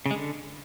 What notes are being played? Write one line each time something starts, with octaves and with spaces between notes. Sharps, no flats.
C#3
G#3
D3